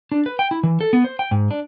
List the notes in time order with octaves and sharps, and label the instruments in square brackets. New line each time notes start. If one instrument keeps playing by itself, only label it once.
[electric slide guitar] D4
B4
G5
E4
E3
A4
B3
C5
G5
G#2
D4